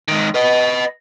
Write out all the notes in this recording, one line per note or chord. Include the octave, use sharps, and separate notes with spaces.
G#2 D#3
B4 D#5